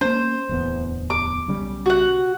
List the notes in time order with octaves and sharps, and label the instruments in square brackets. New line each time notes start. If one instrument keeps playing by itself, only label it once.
[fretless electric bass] A#3 B3 C#4 [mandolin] C5
[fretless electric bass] D1 E2 B3
[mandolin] D6
[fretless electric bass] B1 C#3 G3
[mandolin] F#4 F#5